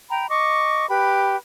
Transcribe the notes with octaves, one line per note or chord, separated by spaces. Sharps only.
G5 A#5 B5
D#5 C#6 D6
G4 B4 B5